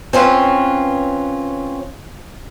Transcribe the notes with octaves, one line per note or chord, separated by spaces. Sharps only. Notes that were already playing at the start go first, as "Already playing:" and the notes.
C4 C#4 F4 B4